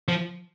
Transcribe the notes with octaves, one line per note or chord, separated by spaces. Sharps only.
F3